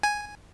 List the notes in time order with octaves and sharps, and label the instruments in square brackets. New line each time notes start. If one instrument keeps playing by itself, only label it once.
[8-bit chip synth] G#5